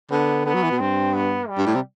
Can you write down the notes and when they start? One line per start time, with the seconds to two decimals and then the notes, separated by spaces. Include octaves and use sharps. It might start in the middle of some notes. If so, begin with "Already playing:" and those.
0.11 D3 B3
0.46 D3 B3
0.54 F#3
0.63 E3
0.71 B2
0.80 G2 C4
1.14 B3
1.49 G3
1.58 G2
1.66 A2
1.75 C3